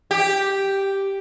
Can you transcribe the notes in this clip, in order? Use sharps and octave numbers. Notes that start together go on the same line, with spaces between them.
G4